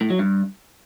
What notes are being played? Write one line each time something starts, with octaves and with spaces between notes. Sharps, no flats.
A2
F#3
G2